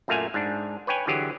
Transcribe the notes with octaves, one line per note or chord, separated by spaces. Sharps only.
F#2 A#2 A3 A#3 F5 G#5
G#2 D4
B4 C#5 G5 G#5
D3 E3 F#3 G4 G#4